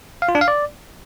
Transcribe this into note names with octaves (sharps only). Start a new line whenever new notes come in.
F5
F4
D4
F5
D5